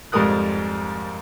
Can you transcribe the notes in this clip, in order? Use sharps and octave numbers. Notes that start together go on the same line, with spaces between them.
F2 G#2 G3 A#4 D#6 F#6